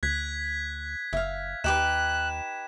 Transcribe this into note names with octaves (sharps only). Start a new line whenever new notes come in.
D2 F#6 G#6 B6
F#1 E5 F5
D#2 D#4 G4 B4 F#6 E7